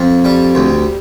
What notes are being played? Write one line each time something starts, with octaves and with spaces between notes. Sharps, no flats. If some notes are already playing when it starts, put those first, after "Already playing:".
Already playing: F2
G3
D2